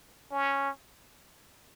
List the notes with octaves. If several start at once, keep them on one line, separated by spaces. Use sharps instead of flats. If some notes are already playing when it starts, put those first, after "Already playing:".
C#4